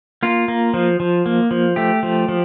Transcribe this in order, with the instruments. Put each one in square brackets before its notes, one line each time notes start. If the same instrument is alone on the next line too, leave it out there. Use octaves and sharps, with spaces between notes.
[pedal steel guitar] A#3 F4
A#3
F3
F3
A#3
F3
A3 G4
F3
F3